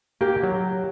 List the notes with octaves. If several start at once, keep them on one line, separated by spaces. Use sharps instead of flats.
A#3 G4 G5
F#3